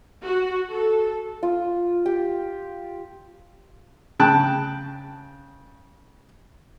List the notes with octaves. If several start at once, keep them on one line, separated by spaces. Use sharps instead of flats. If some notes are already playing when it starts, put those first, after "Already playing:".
F#4
A4
F4
G4
C#3 G5 A5 F#6